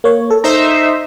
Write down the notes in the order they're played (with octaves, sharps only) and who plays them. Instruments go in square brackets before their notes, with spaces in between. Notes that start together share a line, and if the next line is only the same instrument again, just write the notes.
[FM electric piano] A#3 C#5
A4
[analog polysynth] D#4 C5 E5 [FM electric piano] A#5